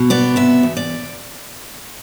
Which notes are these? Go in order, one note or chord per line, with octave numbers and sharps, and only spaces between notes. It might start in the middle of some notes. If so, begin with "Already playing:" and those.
Already playing: B2
B3 D5
C3 E5
E2
D5